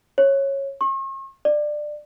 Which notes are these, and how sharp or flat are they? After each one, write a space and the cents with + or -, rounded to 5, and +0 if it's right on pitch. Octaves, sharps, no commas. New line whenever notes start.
C#5 -15
C#6 -45
D5 +20